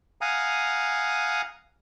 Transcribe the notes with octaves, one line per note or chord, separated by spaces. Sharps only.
F5 F#5 G#5 A#5 D#6